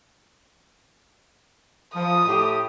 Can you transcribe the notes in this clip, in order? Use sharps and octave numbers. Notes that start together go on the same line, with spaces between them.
F3 D#6
A2 G4